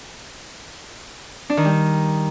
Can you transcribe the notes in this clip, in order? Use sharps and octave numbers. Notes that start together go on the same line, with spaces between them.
D4
D#3
G3